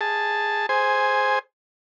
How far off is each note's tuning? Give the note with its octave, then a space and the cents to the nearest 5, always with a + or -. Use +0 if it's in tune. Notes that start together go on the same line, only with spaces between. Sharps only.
G#4 -5 A5 +0
G#4 +15 C5 +0 G#5 +0